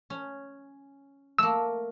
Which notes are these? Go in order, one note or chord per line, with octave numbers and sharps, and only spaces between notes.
C#4
A3 A#3 E6